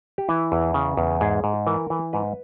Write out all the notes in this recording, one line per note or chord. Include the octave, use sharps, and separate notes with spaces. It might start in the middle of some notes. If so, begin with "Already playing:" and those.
G4
E3 E4
E2
C#3
E2
G#2 G#4
G#2
E3 A#4
E3
G#2 B4